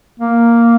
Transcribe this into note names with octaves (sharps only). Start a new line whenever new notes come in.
A#3